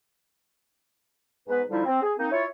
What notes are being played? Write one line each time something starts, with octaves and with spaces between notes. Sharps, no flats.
G#2 B3 B4
D3 F3 G3 D#4 E4
C4
G#4
A#3 C4 D#4
E4 F4 C#5